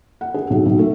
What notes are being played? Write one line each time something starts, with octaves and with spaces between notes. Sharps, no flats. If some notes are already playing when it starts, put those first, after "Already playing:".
F#5
G#4
B1
B1
A3